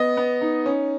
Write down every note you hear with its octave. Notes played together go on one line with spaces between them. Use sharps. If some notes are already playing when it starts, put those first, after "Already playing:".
Already playing: B3 D#5
B3
D#4
C#4